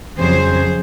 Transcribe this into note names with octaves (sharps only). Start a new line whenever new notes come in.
F2 C#3 F#3 G#4 C5